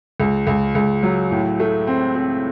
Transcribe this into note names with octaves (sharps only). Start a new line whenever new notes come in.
C#2
C#2
C#2
F#3
A2
A3
C4
C4